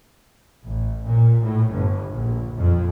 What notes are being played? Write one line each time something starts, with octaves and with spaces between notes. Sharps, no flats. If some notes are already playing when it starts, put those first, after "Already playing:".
A1
A#2
A2
G1
A#1
F2